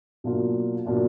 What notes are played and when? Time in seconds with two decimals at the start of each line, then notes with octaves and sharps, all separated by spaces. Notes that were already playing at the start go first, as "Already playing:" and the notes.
0.24 B2 F#3 A#3 D4 F4
0.85 B2 F#3 A#3 D4 F4